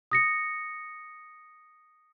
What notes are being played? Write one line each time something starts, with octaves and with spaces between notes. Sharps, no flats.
D#6 A#6 C#7